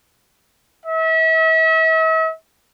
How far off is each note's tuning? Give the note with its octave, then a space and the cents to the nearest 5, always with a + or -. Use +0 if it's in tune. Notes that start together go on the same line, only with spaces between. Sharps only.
E5 -40